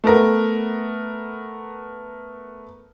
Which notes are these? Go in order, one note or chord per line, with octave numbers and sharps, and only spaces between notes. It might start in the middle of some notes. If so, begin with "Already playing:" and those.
A3 B3 A#4